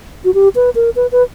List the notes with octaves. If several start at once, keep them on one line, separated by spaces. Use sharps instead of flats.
F#4
G4
B4
A#4
B4
B4